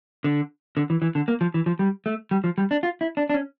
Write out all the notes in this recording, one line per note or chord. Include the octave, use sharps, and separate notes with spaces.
D3
D3
E3
E3
D3
A#3
F3
E3
F3
G3
A3
G3
F3
G3
D4
F4
E4
D4
D4
C#4